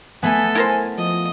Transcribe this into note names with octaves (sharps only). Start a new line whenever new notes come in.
A3 B3 A4 G#5
E4 A#4 C5
F3 D#5